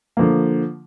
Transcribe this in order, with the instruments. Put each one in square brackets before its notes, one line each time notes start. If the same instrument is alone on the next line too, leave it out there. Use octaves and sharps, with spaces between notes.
[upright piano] D3 F3 A#3